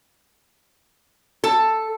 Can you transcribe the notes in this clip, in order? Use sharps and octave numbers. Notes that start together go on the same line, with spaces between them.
A4